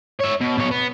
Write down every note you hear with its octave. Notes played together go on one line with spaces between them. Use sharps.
C#5 E5
B2
B2 C#5
B3